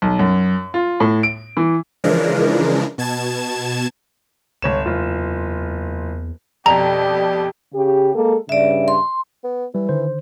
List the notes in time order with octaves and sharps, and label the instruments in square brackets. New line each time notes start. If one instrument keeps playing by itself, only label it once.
[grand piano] B1
F#2
F4
A2
D7
E3
[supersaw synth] C#3 E3 F3 G#3 D4 A#4
B2 A5 G#6 E7
[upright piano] G1 C#5 E7 [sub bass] C#2
[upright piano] F#1 F4 [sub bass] E2
[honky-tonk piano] F2 B2 [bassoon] G3 [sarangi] G4 [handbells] A#5
[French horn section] C#3 G4
G#3 A#3 A4
[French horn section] G2 C#3 [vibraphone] D5 E5
[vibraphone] C6
[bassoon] B3
[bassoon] E3 [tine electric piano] G3
[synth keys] D3 D#3 [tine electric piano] C5